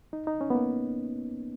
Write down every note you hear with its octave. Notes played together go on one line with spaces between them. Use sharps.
D#4
D#4
C#4
B3
A#3